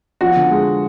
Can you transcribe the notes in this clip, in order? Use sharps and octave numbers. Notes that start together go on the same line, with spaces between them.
F3 F#4
D3
G#3